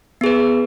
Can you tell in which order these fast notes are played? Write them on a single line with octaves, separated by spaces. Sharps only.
B3 G#4 B4